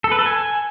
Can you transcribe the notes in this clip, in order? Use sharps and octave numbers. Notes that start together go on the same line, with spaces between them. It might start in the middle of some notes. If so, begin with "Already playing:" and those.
A4
B4
A4
G#5